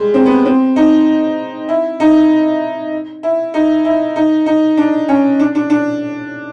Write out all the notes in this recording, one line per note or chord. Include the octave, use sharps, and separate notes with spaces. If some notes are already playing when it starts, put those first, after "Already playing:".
Already playing: G3 G#3
C4
B3
C4
D#4
E4
D#4
E4
D#4
E4
D#4
D#4
D4
C#4
D4
D4
D4